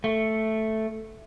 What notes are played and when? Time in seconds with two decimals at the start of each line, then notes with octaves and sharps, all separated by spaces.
0.04 A3